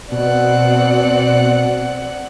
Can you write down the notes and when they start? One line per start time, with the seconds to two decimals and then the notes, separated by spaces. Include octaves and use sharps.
0.11 B2 C4 D5 F#5